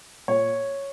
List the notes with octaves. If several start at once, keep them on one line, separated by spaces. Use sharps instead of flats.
A#2 C#5